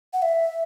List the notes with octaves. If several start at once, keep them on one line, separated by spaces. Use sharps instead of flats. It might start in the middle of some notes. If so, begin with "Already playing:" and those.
F#5
E5